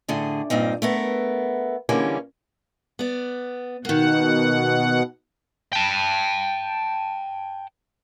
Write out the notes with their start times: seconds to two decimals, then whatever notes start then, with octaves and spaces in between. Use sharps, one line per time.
0.08 A2 D3 G#4
0.50 G2 A#2 C4 D#4
0.82 A3 B3 A#4
1.89 D3 E3 G3 G#3 A#3 C#4
2.99 B3 D5
3.85 B2 D#3 A#3 F#5
5.73 G5 A5